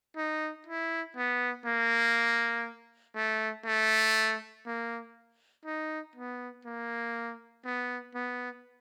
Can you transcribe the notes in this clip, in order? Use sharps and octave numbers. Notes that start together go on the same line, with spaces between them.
D#4
E4
B3
A#3
A3
A3
A#3
D#4
B3
A#3
B3
B3